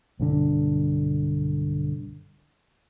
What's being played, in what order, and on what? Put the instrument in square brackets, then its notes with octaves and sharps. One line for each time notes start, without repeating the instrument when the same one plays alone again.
[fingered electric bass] B1 G2 D3